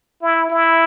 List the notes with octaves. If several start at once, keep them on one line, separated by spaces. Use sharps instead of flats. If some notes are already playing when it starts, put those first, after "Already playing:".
E4
E4